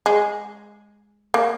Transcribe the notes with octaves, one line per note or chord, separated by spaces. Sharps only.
G#3
A#3